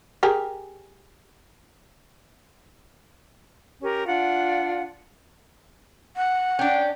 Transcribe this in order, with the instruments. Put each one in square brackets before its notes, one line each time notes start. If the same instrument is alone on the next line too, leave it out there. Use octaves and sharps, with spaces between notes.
[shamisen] G4 G#4 A#4
[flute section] C#4 G4 A#4
D4 F4 F#5
[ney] F#5
[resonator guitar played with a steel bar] C#4 D4 [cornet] G5